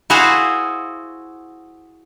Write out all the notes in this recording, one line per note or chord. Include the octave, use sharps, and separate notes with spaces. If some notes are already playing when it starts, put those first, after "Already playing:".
E4 F#4 G#4 C5 F5 F#5